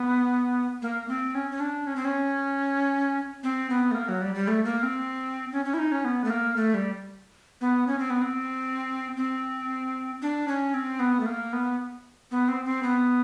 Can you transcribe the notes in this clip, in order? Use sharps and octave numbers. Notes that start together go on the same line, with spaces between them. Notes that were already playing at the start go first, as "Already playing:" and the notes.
Already playing: B3
A#3
C4
C#4
C#4
D4
C#4
C4
C#4
C4
B3
A3
A#3
F#3
G3
G3
A3
A#3
C4
C#4
C#4
E4
D#4
C#4
B3
A3
A#3
A3
G3
B3
C#4
C4
B3
C4
C4
D4
C#4
C4
B3
A3
A#3
B3
B3
C4
C4
B3